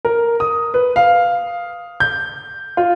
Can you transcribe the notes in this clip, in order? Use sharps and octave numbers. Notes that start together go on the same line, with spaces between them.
A#4
D#6
B4
F5
G6
F4